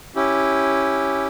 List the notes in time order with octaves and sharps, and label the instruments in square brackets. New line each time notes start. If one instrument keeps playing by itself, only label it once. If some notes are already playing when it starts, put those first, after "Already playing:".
[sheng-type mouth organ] C#4 E4 G4